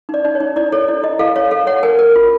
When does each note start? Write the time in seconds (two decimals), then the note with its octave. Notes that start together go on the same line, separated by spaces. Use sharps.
0.09 D#4 D5
0.25 D#4 D5
0.35 C#5
0.40 D#4
0.56 E4 D5
0.72 A4 C#5
0.88 E4 D5
1.03 E4 D#5
1.19 A4 F5
1.36 C#5 F5
1.51 A4 F5
1.67 C#5 F#5
1.83 A#4 G#5
1.99 A#4
2.16 F4